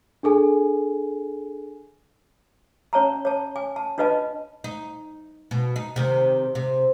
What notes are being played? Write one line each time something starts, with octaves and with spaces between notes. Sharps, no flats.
D4 G#4 A4 G#5
C#4 C#5 A5 A#5
C#5 A5
G#5
A5
D4 F4 B4 D#5 A5
D#4
B2
D#4
C3 D#3
C3